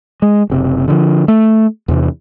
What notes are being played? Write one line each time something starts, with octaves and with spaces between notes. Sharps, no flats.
G#3
F#1 C3
D3 D#3 F3
A3
E2 C3 E3